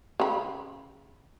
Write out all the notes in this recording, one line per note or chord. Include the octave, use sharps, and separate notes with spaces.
C#3 B5